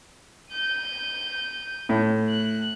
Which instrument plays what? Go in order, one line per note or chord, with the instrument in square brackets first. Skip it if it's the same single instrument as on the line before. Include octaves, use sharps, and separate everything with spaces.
[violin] G6 D#7
[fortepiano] A2
[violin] F#6